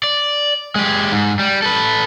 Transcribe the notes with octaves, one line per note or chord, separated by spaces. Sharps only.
D5
G#3 G4
G#2
G3
A4 B4